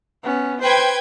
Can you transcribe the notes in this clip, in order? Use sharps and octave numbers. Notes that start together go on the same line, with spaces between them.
B3 C#4
B4 C5 G5 G#6